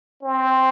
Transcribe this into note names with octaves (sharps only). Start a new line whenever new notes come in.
C4